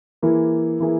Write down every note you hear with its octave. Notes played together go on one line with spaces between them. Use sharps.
E3 A#3 E4 G#4
E3 A#3 E4 G#4